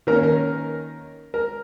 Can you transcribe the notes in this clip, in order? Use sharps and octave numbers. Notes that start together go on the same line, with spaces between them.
D#3 A#3 C#4 A#4
C#5
A#4
A#4